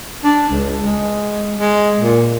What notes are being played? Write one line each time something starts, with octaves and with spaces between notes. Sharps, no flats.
D4
C#2
G#3
G#3
A#2